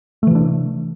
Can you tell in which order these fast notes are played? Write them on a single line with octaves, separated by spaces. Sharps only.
A3 E3 C3 D4